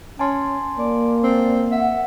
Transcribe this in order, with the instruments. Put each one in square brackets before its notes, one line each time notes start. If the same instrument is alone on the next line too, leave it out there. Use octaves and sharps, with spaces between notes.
[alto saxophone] C#4 [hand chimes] G#5 A5 C6
[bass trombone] A#3 [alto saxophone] D5
[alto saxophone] C4 [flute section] D5
[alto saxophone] E5 [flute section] F#5